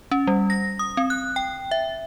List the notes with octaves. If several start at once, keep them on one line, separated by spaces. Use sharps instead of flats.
C#4
G3
A#6
D#6
C4
F#6
G5
E5